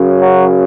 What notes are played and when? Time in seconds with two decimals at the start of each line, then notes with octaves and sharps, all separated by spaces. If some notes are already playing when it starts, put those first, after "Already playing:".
Already playing: F#2 C#3
0.20 F#3